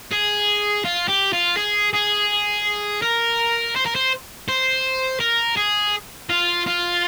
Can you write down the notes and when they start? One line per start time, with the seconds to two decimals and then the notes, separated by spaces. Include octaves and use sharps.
0.12 G#4
0.85 F4
1.08 G4
1.33 F4
1.57 G#4
1.93 G#4
3.02 A#4
3.75 C5
3.86 A#4
3.95 C5
4.48 C5
5.20 A#4
5.57 G#4
6.30 F4
6.66 F4